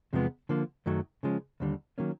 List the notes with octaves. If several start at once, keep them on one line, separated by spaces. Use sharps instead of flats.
E2 C3 F3 G#3 B3
D3 F3 A#3
F#2 D#3 F#3 A3
C#3 F3 G#3 C#4
D#2 D3 G3
D#3 F#3 A#3 C#4